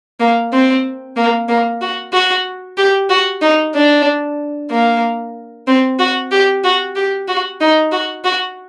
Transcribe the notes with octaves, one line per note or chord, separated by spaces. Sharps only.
A#3
C4
A#3
A#3
F#4
F#4
G4
F#4
D#4
D4
A#3
C4
F#4
G4
F#4
G4
F#4
D#4
F#4
F#4